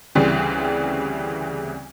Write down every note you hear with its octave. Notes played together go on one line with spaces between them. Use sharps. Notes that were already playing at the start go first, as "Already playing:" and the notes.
D2 C#3 E3 G3 C4